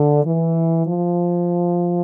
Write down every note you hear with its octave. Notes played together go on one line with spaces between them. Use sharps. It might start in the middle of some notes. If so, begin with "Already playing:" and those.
Already playing: D3
E3
F3